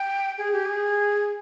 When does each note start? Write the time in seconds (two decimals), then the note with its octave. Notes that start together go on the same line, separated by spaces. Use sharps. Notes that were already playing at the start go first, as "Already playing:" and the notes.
Already playing: G5
0.38 G#4
0.53 G4
0.65 G#4